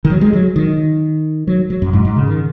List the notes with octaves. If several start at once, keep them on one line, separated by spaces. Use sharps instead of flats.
D#3
F#3
G#3
F#3
D#3
F#3
F#3
F#2
G#2
G#2
C#3
D#3